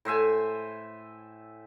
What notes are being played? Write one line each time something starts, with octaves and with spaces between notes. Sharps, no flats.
A2 C5 E5 G#5